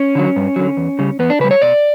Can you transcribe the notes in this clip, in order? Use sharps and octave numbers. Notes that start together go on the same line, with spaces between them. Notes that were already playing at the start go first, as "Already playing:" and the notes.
Already playing: C#4
D3 F#3
G2
D3 F#3
E2
C#3 G3
E2 B3
D4
C#3 G3 B4
C#5
B2 D5